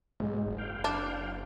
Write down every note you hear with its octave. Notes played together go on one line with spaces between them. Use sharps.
B1 G#2 G#3
F#1
F5 G5
D4